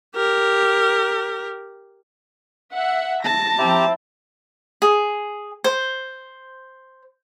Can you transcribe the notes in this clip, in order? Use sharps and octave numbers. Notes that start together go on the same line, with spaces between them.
G4 A#4
E5 F#5
A5 A#6
F3 C4 E4 G4 A#5
G#4
C5